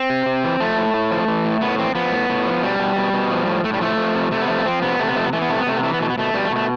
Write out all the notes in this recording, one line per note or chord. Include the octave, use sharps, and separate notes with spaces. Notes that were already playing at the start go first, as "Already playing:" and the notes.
Already playing: C4
C3
C3
E3
F3 A3
A2
A2
F3
E3
A2
A2 B3
E3 C4
F3 B3
A2
A2
F3
B2 G3
B2
B2
B2
F3
A2
A2 A3
G3
F3 A3
F3
C3
C3 A3
B3
F3 A3
B3
F3 C4
C3 B3
C3 A3
B3
F3 A3
B3
E3 A3
B3
C3 A3
B3
C3 A3
B3
E3 A3
B3
B2 A3
B3
B2 A3
B2 G3
A3
B2
A3